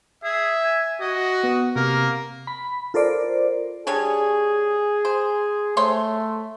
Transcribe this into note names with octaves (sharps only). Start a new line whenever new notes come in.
G#4 E5
G#5
F#4 D#5
B3
C3 A#3 A#4
B5
F4 A4 A#4 C5 D5
D3 G3 G#4 C#5
C5
A3 C5 C#5 C6